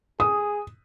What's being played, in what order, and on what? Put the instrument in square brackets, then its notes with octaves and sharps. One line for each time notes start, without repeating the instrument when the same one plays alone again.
[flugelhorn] G#4 [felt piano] D#6